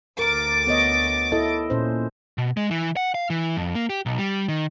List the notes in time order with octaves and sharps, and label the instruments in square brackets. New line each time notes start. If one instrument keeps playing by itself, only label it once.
[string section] D2 D6 A6 [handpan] A#4
[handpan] B3 C#5 D#5
E4 A4 D#5
A#2 C#4 C5
[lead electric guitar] B2
G#3
E3
F#5
F5
E3
F2
A#3
G4
B1
G3
D#3